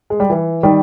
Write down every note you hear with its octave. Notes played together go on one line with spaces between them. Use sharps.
G#3
G3
E3
D#3 G3